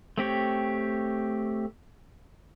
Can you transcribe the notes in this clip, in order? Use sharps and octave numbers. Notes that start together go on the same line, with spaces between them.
A3 C4 G4 C#5